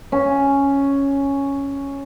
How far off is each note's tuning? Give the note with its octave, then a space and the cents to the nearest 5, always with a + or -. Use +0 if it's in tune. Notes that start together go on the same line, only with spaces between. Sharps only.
C#4 +0